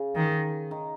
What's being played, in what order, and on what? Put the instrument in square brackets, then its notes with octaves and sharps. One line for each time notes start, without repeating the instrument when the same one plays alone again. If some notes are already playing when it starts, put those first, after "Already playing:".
Already playing: [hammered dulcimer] C#3
[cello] D#3
[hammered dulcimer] D#3